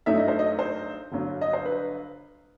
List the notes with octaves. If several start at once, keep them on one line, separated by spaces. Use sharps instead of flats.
G2 F#3 A3 D#4 E5
D#5
C5
D#5
C5
G1 G2 F#3
D#5
C5
B4